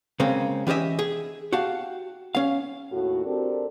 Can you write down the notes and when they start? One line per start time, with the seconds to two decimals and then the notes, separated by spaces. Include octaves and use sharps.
0.20 C#3 G#3 A#3 C4 C#4
0.67 E3 C#4 G4 D#5 E5
0.99 G#4
1.53 F#4 G4 F5 A5
2.35 C#4 F5
2.91 D#2 A2 F#4
3.25 C4 D4 G4 A4 A#4